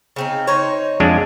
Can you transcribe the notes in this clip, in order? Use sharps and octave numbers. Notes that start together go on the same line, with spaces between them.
C#3 C4 D#4
D#4 C5 C#5
F2 G#3 D4